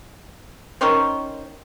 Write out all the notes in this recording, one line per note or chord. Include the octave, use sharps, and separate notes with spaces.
D#3 C#4 C5